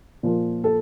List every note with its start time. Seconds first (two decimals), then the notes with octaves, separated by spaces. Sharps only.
0.23 A#2 F3
0.64 A4